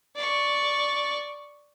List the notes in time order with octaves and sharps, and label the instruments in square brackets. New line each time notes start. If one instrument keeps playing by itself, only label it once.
[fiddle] D5 C#6